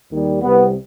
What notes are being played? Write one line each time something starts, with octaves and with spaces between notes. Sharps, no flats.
D#2 D#3 G3
C2 C3 G3 B3